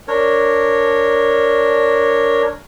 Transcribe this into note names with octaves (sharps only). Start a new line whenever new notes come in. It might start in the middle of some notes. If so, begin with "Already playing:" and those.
D4 A#4 C#5